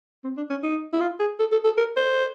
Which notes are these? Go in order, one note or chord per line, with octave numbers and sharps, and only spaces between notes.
C4
D4
C#4
D#4
E4
F4
G#4
A4
A4
A4
A#4
C5